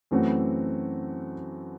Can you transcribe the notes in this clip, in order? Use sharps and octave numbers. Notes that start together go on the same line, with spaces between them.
F#2 E3 A3 C4 F#4